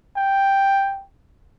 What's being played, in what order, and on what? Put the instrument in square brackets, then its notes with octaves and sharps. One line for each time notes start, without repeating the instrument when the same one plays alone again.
[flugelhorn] G5